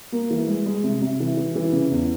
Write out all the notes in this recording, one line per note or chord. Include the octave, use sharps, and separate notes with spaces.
A#3
E3
G#3
G#3
C3
C3
E3
E3
E3
C#3
E2